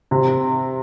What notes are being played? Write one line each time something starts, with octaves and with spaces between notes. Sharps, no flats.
C3